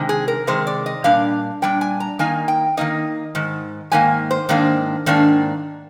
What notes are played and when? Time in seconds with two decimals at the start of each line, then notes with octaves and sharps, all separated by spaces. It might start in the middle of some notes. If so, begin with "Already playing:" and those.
Already playing: C3 D#3 G#3
0.09 G#4
0.28 A#4
0.47 C3 D#3 G#3 C5
0.67 D5
0.86 D#5
1.04 A#2 G3 D4 F5
1.62 A#2 G3 D4 G5
1.81 G#5
2.00 A#5
2.19 D#3 A#3 D#4 G#5
2.48 G5
2.77 D#3 A#3 D#4 D#5
3.35 G#2 D#3
3.92 G#2 D#3 A#3 G#5
4.31 C5
4.49 G#2 D#3 A#3 D4
5.06 G#2 D#3 A#3 D4